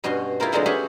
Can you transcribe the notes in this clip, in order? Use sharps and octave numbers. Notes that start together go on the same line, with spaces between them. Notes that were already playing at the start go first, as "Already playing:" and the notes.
G2 B2 C#4 F#4 C6
E4 F4 G#4 A#4 C5
B2 D3 F#3 G#3 C4 F4
C#4 G4 G#4 E5 F#5